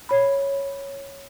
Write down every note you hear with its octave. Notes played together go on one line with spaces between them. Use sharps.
C#5 B5